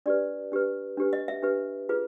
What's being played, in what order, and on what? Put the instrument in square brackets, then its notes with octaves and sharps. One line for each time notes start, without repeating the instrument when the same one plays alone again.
[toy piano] D4 G4 B4 D5
D4 G4 B4
D4 G4 B4
D#5
E5
D4 G4 B4
F4 G#4 B4